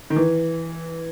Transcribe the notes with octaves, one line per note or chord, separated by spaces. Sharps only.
D#3
E3